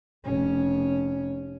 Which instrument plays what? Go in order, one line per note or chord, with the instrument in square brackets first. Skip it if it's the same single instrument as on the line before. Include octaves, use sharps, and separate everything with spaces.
[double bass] F1 C#4